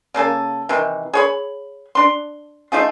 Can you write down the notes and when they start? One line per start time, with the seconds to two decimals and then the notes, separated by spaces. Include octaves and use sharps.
0.14 C#3 A#3 A4 G#5
0.69 C3 D#3 E3
1.13 G#4 C#5 B5
1.95 D4 C6
2.72 A3 D#4 F4 G#4